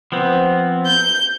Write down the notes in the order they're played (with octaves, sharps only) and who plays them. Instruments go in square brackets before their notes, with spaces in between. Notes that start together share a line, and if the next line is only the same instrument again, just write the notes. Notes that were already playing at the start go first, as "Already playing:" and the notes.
[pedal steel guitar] F3 B3 C4
[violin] G6